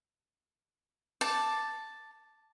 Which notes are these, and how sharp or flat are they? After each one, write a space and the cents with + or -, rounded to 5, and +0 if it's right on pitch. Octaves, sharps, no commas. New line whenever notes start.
A5 +0 D6 +0